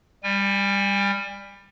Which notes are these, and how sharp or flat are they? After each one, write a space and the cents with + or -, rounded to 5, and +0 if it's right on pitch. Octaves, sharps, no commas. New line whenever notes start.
G3 +15 G#5 -40